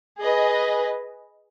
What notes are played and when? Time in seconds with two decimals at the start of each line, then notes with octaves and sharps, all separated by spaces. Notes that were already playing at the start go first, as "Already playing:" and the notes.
0.19 G#4 B4 D#5